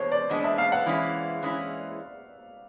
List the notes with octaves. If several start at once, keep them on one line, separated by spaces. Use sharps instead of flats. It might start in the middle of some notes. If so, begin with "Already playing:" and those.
Already playing: E2 B2 G#3 B3 D4 C5 C#5
D5
E2 B2 G#3 B3 D4 D#5
E5
F5
F#5
E3 G#3 C#4 E4
E3 G#3 C#4 E4